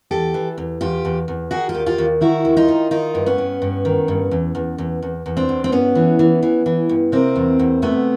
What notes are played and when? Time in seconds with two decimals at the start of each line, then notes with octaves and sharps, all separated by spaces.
0.11 E2 G4 A4
0.34 E3
0.58 E2
0.81 E2 F4 G4
1.05 E2
1.28 E2
1.51 D#3 F#4 G#4
1.69 F4 G4
1.74 D#2
1.86 F4 G4
1.98 D#2
2.21 D#3 E4 F#4
2.45 D#2
2.57 D#4 F4
2.68 D#3
2.91 D#3 D#4 F4
3.15 G2
3.26 B3 C#4
3.38 G2
3.62 G2
3.85 D#3
4.08 G2
4.31 E2
4.55 E2
4.78 E2
5.02 E2
5.26 E2
5.37 C4 D4
5.49 E2
5.64 C4
5.72 G2 B3 C#4
5.95 E3
6.19 E3
6.43 E3
6.66 E3
6.89 G2
7.12 C3 A#3 C4
7.36 E2
7.59 E2
7.82 C3 A3 B3